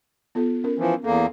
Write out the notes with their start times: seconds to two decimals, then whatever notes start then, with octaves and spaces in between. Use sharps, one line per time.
0.35 B3 F4 A4
0.64 C#4 A#4
0.79 E3 F3
1.04 E2 A#3 A4